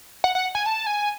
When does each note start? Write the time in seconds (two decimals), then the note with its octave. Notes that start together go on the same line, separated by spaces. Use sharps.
0.24 F#5
0.35 F#5
0.55 G#5
0.66 A5
0.87 G#5